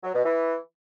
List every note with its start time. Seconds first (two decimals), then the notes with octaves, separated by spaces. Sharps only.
0.04 F#3
0.14 B2
0.25 E3